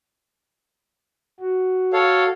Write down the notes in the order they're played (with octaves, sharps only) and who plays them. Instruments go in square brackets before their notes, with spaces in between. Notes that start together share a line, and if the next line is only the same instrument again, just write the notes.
[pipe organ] F#4
[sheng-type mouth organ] A4 C#5 F5